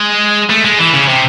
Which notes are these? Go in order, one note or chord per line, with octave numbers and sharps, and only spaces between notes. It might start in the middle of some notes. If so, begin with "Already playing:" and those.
Already playing: G#3
A3
G#3
E3
C#3
C3